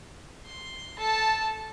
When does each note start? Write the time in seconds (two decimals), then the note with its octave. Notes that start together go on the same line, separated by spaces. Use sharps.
0.45 C6
0.98 A4 A5